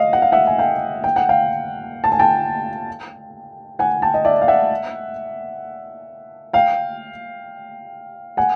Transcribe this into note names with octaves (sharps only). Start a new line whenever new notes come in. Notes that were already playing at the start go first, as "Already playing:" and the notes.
Already playing: D#5 F5
F#5
F5
E5 F#5
G#5
F5 G5
G5
F#5
F5 G5
A5
G#5
G5 A5
F#5 G#5
G5 A5
D#5
D5 E5
F5
E5 F#5
F5 G5
F#5 G#5